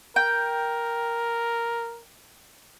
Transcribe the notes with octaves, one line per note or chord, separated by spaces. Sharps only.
A#4 G5